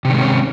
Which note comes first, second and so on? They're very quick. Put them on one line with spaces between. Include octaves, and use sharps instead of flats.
C3 D#3 G#3 C4 C#4